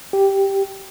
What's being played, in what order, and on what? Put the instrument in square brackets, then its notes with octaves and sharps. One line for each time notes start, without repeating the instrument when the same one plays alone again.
[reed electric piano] G4